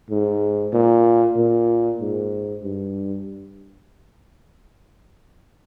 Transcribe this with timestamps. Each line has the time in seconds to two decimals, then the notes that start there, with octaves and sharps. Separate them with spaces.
0.10 G#2
0.73 A#2
1.37 A#2
2.01 G#2
2.64 G2